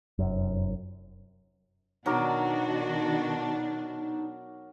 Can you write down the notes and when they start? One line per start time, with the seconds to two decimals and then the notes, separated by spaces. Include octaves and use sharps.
0.19 F1 F#2
2.06 B2 D#3 F#3 D4 D#4 F#4 A#4 D6